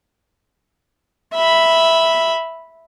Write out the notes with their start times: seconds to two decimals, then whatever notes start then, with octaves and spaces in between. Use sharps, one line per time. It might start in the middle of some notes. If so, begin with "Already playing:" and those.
1.34 E5 B5